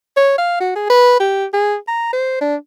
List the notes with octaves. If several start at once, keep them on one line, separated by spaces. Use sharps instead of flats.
C#5
F5
F#4
G#4
B4
G4
G#4
A#5
C5
D4